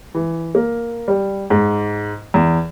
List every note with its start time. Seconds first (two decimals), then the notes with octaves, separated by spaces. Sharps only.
0.14 E3
0.55 A#3
1.08 G3
1.50 G#2
2.34 E2